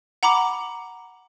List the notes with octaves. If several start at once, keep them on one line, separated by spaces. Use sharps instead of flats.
F#5 A#5 B5 D6